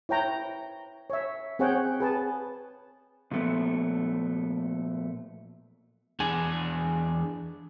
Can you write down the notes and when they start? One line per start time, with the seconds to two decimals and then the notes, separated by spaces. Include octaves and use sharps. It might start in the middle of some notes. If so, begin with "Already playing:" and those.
0.09 E4 C#5 G5 A#5
1.10 C#5 E5
1.59 C4 G#4 C#5 F#5 G5
2.00 G#4 B4 A5
3.31 A#2 F3 A3 B3
6.20 E2 D4 G#4 G#5